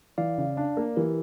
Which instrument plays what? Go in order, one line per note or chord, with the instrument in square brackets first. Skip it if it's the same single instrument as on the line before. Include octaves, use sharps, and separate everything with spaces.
[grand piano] E3 [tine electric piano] D5 F5
[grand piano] C#3
D4
A#3
[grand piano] E3 [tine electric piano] G4 A#4